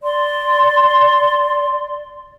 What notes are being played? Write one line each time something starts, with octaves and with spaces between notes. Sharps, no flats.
D5 C6